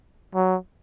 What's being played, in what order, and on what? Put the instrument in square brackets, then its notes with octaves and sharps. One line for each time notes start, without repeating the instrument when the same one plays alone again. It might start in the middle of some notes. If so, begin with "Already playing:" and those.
[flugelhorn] F#3